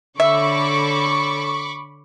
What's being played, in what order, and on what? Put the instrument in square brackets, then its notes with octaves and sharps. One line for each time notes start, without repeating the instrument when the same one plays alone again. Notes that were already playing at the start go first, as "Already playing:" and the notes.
[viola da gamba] D3 A4 C#5 [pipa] E5 [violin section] B5 C#6 D6